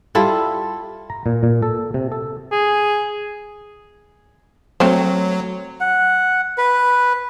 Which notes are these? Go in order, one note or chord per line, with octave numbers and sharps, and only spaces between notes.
G3 E4 F4 A4
A#5
A#2
A#2
A4
C3
A4
G#4
F#3 A3 C4 C5
F#5
B4